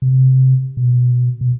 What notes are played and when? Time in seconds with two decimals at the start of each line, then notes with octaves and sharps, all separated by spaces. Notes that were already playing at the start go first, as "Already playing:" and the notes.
0.02 C3
0.77 B2
1.41 B2